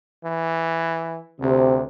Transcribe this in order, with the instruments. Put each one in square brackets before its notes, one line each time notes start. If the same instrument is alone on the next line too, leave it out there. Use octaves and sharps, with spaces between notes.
[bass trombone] E3
[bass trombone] D2 [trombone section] C3